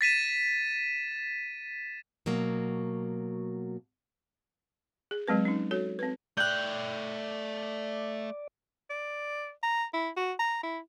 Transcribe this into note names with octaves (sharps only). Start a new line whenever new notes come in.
A6 B6 D#7 E7
B2 F#3 A#3
G#4
F#3 G#3 C4 B4
C#4 D#4
F#4 A4 C#5
C4 B4
A3 D5 G5 F#6 G6
D5
A#5
E4
F#4
A#5
E4